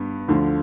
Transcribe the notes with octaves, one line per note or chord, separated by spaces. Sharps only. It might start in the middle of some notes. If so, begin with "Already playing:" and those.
Already playing: G2 B3
D2 D3 F3